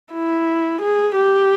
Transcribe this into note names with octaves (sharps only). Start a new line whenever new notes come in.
E4
G#4
G4